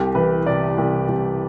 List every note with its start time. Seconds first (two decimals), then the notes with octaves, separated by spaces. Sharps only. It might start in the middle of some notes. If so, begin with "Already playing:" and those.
Already playing: C2 G4
0.15 E3 B4
0.46 C3 D5
0.78 C2
1.08 C2